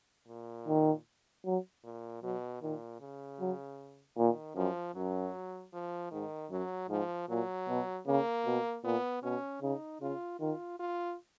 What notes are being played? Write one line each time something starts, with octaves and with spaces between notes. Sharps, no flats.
A#2
D#3
F#3
A#2
B2 F#3
A#2 D#3
C#3
F#3
A#2 D#3
F#2 F3
F#2 F#3
F3
G#2 D#3
F#2 F#3
G#2 F3
A#2 F#3
B2
C#3 A#3
B2
A#2 B3
B2 C#4
C#3 D#4
C#3 F4
D#3 F4
F4